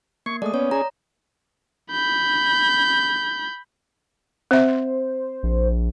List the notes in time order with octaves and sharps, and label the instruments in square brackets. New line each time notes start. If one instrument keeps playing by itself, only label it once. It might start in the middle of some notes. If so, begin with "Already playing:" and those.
[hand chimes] A#3 [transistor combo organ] C#6
[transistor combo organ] G#3 A3 [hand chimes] D5 D#6
[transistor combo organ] B3 C#4 [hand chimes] C#5
[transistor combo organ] C#4 G#4 [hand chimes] A#5
[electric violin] B5 G6
[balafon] C4 E5 [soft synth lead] C5
[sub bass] A#1